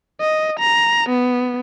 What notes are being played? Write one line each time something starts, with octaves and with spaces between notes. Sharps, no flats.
D#5
A#5
B3